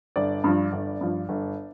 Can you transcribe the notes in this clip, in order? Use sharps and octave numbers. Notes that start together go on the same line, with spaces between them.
G1 D5
G2 F3
G1
G2 F3
G1